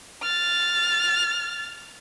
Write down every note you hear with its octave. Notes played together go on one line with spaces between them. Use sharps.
F6 A6